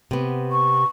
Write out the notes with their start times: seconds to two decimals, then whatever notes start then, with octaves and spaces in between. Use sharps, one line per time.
0.11 C3 B3
0.52 C#6